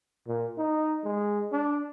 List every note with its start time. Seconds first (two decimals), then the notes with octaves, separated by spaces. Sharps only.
0.27 A#2
0.58 D#4
1.04 G#3
1.52 D4